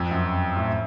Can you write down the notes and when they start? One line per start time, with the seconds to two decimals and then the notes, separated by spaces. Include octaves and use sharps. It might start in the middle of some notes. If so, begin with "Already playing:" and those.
Already playing: F2
0.11 F#2
0.57 A2